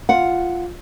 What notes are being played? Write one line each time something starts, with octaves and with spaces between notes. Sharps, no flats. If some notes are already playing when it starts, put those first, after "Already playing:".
F4 F#5